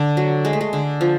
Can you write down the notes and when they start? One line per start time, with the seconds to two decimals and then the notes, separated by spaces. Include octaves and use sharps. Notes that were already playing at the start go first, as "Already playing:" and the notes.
Already playing: D3
0.17 F#3
0.45 G#3
0.53 A3
0.61 G#3
0.73 D3
1.01 F3